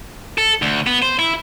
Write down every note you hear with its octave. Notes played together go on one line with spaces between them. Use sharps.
A4
D2
B3
C5
E4